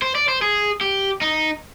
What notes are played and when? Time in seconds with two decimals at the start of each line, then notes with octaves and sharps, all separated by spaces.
0.02 C5
0.15 D5
0.28 C5
0.42 G#4
0.81 G4
1.21 D#4